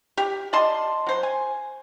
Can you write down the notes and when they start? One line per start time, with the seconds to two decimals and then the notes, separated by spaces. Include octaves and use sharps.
0.17 G4
0.53 D5 D#5 A5 C6
1.07 F#3 C5
1.23 G#5